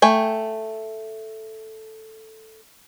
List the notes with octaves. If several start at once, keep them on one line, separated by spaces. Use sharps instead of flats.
A3 G5 G#5